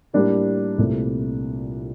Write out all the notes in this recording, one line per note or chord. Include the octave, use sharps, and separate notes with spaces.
A2 G3 A#3 D4 G4
C2 A#2 A3 C4